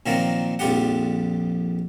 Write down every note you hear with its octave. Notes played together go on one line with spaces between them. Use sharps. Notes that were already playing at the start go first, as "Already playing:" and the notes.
A#2 D#3 F3 F#3 A#3 C4
A#1 F2 G3 F4 G4 F#5